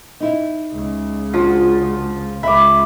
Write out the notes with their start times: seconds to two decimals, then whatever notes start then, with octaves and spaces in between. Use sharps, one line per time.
0.20 D#4 E4
0.72 C#2 C#3
1.34 F3 D4 F#4
2.43 C#2 E5 B5 D6